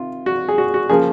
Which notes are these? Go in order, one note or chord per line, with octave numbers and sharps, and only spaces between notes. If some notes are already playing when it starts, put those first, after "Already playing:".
Already playing: C3 D#3 F4
F#4
G#4
F#4
F#4
C#3 F3 A#3 G#4